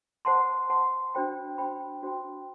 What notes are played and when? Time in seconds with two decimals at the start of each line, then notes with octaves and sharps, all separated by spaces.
0.25 C5 F#5 A5 C6
0.70 C5 F#5 A5 C6
1.14 D4 F#4 C5 G5 B5
1.58 D4 F#4 C5 G5 B5
2.03 D4 F#4 C5 G5 B5